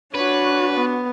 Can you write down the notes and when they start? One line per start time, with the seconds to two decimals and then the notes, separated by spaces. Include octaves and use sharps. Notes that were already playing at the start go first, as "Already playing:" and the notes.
0.15 D4 F#4 B4 C#5
0.74 B3